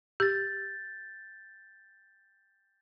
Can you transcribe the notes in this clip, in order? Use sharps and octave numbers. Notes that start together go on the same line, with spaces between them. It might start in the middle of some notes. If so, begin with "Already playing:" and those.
G4 G6 A6